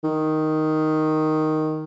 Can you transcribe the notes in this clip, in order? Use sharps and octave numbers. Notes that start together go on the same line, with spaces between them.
D#3